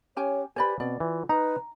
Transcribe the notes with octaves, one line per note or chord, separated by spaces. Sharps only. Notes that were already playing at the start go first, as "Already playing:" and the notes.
C#4 G4 C#5 G#5
G4 B4 C5 D5 G#5 B5
B2 C4 D5
E3 F4
D#4 B4 A#5